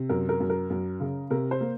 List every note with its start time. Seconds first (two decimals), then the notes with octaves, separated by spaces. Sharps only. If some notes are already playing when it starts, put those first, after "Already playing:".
Already playing: C3
0.09 F#2 A#4
0.29 A#4
0.40 F#2
0.50 A#4
0.70 F#2
1.00 C#3
1.30 C3 A#4
1.51 C5
1.61 A#3